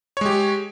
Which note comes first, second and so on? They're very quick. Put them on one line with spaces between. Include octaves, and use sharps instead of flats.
C#5 G#3 G4